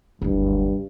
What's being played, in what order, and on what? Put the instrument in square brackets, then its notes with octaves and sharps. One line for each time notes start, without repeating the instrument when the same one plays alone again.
[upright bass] F#1 D2 [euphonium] G2